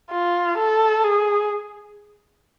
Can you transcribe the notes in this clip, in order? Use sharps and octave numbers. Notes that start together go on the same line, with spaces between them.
F4
A4
G#4